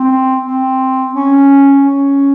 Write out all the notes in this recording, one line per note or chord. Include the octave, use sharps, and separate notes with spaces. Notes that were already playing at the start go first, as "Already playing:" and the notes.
Already playing: C4
C4
C#4
C#4